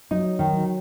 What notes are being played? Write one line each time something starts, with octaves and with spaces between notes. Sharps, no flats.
F#3 D#4
D#3
F#3